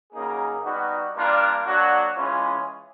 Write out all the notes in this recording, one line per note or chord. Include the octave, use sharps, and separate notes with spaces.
C#3 F#3 A#3 D#4 G#4
G3 B3 D#4 F#4
G3 A#3 D4 F4
F#3 A#3 D4 F#4
E3 G#3 C#4 F4 G#4